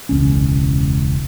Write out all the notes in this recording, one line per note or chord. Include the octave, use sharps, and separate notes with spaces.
E1 C#2 C#4